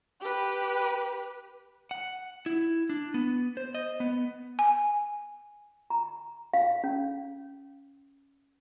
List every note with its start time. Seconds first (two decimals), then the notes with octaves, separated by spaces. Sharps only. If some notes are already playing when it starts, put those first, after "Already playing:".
0.21 G4 B4
1.91 F#5
2.46 E4
2.90 D4
3.14 B3
3.57 C5
3.75 D#5
4.00 B3
4.59 G#5
5.90 A#5
6.54 F5
6.84 C#4